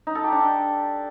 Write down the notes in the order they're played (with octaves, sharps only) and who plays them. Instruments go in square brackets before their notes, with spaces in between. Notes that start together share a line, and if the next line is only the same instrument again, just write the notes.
[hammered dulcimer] D#4
A4
G4
D4